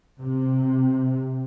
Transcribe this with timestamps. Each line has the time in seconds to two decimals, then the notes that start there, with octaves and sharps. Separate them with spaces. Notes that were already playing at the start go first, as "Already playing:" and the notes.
0.19 C3